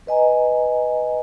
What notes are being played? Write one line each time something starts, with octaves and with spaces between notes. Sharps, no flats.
B4 D#5 G#5 A#5